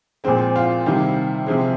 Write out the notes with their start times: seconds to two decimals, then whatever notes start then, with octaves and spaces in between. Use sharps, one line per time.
0.24 A#2 F3 G#3 C4
0.56 F4
0.86 C3 D#3 G3
1.46 C3 F3 G#3